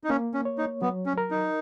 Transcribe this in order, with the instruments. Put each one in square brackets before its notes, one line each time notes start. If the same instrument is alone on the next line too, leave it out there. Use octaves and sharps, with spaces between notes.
[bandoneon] D#4
[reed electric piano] A#3 [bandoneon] C#4
[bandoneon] C#4
[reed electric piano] C#5
[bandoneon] D#4
[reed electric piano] F#3 [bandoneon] B3
[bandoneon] C#4
[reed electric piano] A#4
[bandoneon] D#4